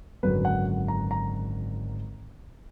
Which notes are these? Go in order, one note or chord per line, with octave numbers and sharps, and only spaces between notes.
G#1 F#2 D3 F#3 B4
F#5
A#5
A#5